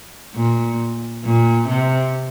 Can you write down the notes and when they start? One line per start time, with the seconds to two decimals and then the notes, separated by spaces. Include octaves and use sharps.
0.35 A#2
1.24 A#2
1.69 C3